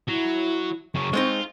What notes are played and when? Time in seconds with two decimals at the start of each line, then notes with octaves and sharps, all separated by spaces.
0.09 F#3 E4
0.95 F#2 C#3 C#6
1.13 G#3 C4 D#4 F4